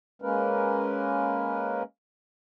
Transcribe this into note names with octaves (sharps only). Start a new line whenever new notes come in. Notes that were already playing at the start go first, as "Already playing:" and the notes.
G#3 A#3 C#4 A#4 B4